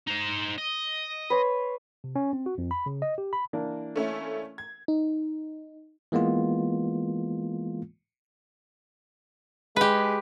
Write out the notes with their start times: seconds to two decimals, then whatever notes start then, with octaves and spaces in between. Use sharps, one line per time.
0.07 D#4 C5
0.58 D#5
1.30 B4 C#5 C6
2.04 C3
2.16 C#4
2.33 C4
2.46 F#4
2.58 F2
2.71 B5
2.86 C#3
3.02 D#5
3.18 G4
3.33 B5
3.53 E3 A#3 D4
3.96 A3 C#4 E4
4.58 G#6
4.88 D#4
6.12 E3 G#3 A#3 B3 F4
9.76 G#3 G4 B4